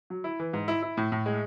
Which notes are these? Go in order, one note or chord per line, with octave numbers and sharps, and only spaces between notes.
F#3
E4
E3
G#2
E4
E4
A2
A2
G#3